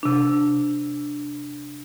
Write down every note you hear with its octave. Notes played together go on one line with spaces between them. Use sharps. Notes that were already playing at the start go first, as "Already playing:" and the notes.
C3 D4